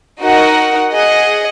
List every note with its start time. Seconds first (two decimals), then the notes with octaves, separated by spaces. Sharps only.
0.24 D#4 F#4 A#4 D#5 F#5
0.92 G#4 D#5 F#5